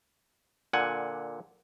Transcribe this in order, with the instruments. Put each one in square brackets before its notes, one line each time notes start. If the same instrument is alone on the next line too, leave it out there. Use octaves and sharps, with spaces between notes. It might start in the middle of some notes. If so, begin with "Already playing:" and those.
[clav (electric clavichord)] A#2 D3 F#5 G#5